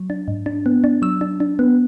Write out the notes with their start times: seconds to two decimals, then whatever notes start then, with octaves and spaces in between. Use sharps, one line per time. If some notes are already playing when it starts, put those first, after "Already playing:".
Already playing: F#3
0.10 D4
0.28 G#2
0.46 D4
0.66 B3
0.84 D4
1.02 F#3 E6
1.21 D4
1.40 D4
1.59 B3